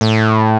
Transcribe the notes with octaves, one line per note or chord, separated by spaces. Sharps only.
A2